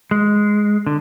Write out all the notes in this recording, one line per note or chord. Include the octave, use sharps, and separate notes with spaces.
G#3
D3